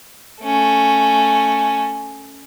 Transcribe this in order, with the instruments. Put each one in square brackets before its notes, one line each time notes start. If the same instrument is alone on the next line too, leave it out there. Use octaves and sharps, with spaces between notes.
[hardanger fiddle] A3 C#4